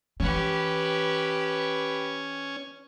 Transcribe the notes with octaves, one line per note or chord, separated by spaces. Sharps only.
E3 C#4 G4 B4